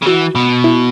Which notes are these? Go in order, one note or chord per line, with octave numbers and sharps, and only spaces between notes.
C#3
E3 F#4
B2
E4